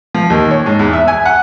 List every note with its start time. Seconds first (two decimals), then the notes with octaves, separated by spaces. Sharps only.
0.15 F3
0.30 D#2
0.51 C#5
0.66 G#2
0.79 E2
0.93 E5
1.08 G#5
1.25 F#5